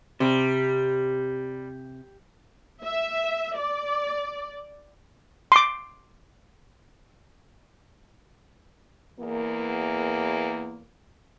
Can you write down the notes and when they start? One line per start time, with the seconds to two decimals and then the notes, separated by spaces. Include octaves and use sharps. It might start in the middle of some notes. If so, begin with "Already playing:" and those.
0.20 C3 G3
2.84 E5
3.57 D5
5.52 C6 D6
9.20 E2 A#3